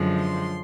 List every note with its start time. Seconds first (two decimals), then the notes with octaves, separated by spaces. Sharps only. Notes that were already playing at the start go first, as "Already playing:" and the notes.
Already playing: F#2 D3 F3 G#3
0.20 C6